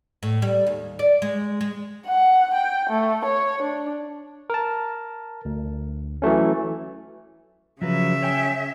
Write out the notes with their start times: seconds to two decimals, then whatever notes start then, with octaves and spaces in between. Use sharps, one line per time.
0.23 A2
0.42 G3
0.67 D#2
0.99 D5
1.22 G#3
1.61 G#3
2.07 F#5
2.54 G5
2.90 A3
3.25 C#5
3.62 D4
4.50 A#4 A5
5.45 D2
6.22 E3 F#3 A3 C#4
7.81 C#3 F3 F#3 B4 E5
8.23 C#5 G5 G#5